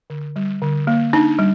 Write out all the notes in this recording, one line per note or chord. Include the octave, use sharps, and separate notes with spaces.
D3
G3
D3
A#3
D4 D#4
G3